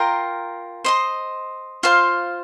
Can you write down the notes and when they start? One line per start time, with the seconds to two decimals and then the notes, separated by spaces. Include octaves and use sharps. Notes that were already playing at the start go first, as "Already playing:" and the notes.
Already playing: F4 A#4 G5 A#5
0.84 C5 D#5 C6
1.83 F4 C5 F5